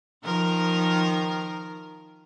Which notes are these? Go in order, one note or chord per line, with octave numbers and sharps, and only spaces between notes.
D#3 F3 A#4